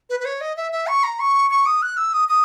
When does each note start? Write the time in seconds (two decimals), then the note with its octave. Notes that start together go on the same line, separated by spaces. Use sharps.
0.10 B4
0.20 B4
0.25 C#5
0.41 D#5
0.57 E5
0.72 E5
0.87 C#6
1.03 A#5
1.19 C#6
1.51 C#6
1.66 D#6
1.82 F#6
1.97 E6
2.13 D#6
2.29 D#6